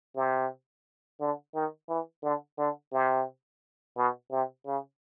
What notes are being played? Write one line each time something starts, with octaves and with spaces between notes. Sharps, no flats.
C3
D3
D#3
E3
D3
D3
C3
B2
C3
C#3